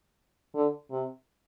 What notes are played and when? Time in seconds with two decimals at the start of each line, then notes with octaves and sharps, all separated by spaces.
0.55 D3
0.91 C3